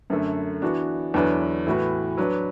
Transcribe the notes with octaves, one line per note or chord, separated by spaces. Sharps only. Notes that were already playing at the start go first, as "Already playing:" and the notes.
F#2 D3 A3
E3 B3 D4 F#4
E2 D3 F#3 D4 B4
A2 E3 B3 F#4 B4
F#3 D4 B4